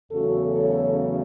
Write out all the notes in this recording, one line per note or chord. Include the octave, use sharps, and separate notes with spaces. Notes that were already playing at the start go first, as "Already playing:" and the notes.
E2 C#3 F#3 A3 C#4 F#4 A4
A4 C#5